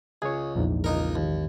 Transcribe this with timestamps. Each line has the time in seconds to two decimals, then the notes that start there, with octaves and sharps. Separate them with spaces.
0.22 C#2 G#4 C#5
0.56 A#1 E2 G#2
0.84 C#2 D#4 A#4
1.16 D#2